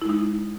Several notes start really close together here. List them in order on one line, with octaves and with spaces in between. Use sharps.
E4 G#3 D#4